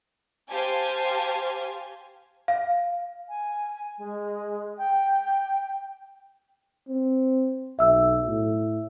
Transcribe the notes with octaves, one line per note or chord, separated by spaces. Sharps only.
G4 C5 F5 G#5 A5
F5
G#5
G#3
G5
C4
B1 E5 E6
A2